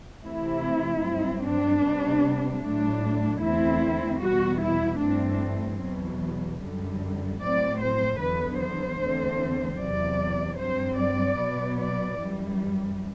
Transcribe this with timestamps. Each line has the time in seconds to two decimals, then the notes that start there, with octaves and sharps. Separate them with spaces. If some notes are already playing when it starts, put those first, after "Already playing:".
0.23 C3 E3 A3 C4 E4
1.02 G2 F#3 C4
1.42 D4
1.83 C3 G3 B3
2.62 A2 F#3 A3 D4
3.41 E2 D3 A3 C4 E4
4.21 E2 B2 G3 B3 F#4
4.61 E4
5.01 G2 E3 A3 C4 D4
5.82 E2 B2 F#3
6.61 F#2 D3 G3
7.41 A2 F#3 C4 D5
7.81 C5
8.20 E2 D3 F#3 B3 B4
8.59 C5
9.00 E2 D3 A3 C4
9.79 E2 C3 F#3 D5
10.59 G2 F#3 C4 C5
10.99 D5
11.39 B2 F#3 B3
11.79 D5
12.19 F#2 E3 G3